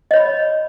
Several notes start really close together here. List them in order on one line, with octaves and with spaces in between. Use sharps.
D#5 C#5 B5